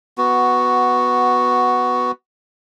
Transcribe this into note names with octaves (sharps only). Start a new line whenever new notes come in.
B3 F#4